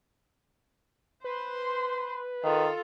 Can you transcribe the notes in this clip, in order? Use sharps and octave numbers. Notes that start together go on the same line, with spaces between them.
B4 C5 C6
D#3 F4 A4